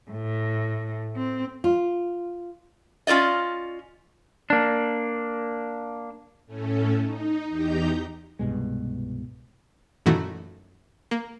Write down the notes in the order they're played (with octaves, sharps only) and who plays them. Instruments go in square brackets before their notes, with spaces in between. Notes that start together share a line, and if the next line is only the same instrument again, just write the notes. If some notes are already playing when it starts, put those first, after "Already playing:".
[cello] A2
C4
[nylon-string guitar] F4
[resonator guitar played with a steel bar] C#4 F4 A#4 D5 D#5
[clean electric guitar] A#3 D4
[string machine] A2 A3 C#4
D#4
E2 D#4 G4 A#5 G6
[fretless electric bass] C2 G2 B2 G#3
[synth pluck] F#2 A#2 D#3 E3 A3 F#4
A#3